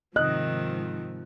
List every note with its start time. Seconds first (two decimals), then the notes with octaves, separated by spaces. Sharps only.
0.16 G#2 C3 D#3 F3 D#5 F#6